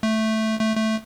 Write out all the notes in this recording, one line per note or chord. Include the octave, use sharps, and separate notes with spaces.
A3
A3
A3